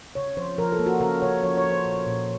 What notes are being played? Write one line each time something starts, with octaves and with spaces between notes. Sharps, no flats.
C#3 C#5
F3 C5
F3 A#4
A4
A#3
F#4
C#3 A#4
C#3 C#5
F3 C#5
C#5
F3
C5
A#2
A#2